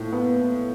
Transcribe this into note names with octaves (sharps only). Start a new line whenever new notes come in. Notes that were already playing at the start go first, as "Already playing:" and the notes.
Already playing: A2 F3
B3